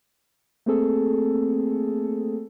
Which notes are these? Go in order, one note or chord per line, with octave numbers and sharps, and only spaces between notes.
A3 A#3 C4 G#4 A4